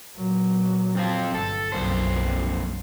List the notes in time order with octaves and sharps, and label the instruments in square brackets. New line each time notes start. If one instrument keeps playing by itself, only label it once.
[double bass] A#2 F#3
[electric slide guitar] F2 C4 F4
[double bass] G1 [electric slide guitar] A4
[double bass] F#1 B1 [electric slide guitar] F2 A#2 C5